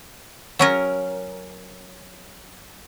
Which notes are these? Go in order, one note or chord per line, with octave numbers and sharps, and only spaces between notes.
F#3 C#4 A#4